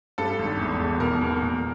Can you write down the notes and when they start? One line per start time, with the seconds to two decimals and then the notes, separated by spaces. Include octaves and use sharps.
0.18 G2 A4
0.39 G#1
0.59 E2
0.79 E1
1.00 B2 A#4
1.21 E2
1.41 A#2